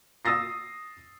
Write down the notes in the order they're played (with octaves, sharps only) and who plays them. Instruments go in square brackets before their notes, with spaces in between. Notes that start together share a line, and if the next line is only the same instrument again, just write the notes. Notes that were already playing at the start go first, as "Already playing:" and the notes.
[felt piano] D#6 E6 A6 A#6 C7